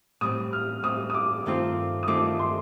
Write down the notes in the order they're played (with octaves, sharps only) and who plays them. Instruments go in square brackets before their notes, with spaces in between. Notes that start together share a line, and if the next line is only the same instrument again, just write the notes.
[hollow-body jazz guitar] A2 G3 C4 [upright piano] D#6
[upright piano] F6
[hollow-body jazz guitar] A2 G3 C4 [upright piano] D#6
[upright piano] D#6
D6
[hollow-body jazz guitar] G2 D#3 A3 C4 F4
[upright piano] D#6
[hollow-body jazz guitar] G2 D#3 A3 C4 F4 [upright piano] D6
[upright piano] C6